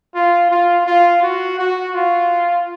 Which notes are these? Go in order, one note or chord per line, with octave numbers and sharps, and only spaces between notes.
F4
F4
F4
F#4
F#4
F4